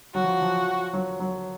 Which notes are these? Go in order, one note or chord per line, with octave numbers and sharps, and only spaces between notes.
F#3 F#4
F3
F3
F#3
F#3